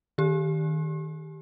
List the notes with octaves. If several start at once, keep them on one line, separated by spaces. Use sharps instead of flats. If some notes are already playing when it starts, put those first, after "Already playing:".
D#3 G4